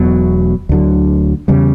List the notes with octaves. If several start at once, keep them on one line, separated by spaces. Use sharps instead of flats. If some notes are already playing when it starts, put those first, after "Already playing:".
Already playing: E1 E2 B2 F#3
D2 D3 F#3
E2 C#3 G3